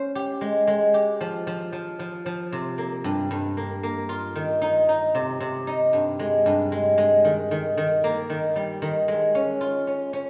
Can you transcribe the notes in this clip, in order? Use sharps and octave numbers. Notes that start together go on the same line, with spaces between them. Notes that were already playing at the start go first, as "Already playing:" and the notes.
Already playing: C#4 C5
G4
G#3
G#3
G4
F3
F3
F3
F3
F3
C3
A#3
G2
G2
A#3
A#3
F4
D#3
D#4
D#4
C3
C3
D#4
G2
G#3
G2
G#3
G#3
D#3
D#3
D#3
A#3
D#3
G3
D#3
G#3
C#4
F4
C#4
C#4